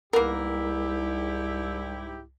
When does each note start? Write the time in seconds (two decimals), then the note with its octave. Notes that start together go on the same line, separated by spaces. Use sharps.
0.13 C2 G#2 A#3 B3 E4 G4 A#4